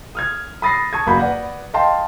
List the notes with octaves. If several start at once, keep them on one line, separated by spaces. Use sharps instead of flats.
D#6 F6 G#6
B5 D#6 A6 A#6 C7
A5 C#6 D#6 G#6
F#1 A#3 F#4 B5 G6
B4 D5 F#5
D#5 F5 G5 A5 C6